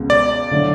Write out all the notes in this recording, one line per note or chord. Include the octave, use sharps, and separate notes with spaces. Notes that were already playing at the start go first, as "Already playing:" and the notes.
Already playing: C#2 B2 G#3
D5
D3 F#3 A3 D4